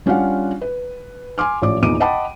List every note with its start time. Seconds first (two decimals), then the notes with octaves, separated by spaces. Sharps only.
0.06 G3 C#4 D4 F4 F5 F#5
0.62 B4
1.38 G#5 C6 D6 F6
1.62 A1 F3 C#5 D5 D6
1.82 E2 A#2 D#4 D6 D7 D#7
2.00 D#5 F#5 G5 A5 B5 D6